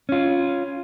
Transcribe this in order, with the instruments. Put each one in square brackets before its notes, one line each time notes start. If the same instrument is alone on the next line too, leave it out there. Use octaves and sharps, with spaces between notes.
[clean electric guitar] C#4 F4